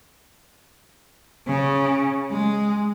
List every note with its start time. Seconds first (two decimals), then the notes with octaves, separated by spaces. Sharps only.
1.47 C#3
2.31 G#3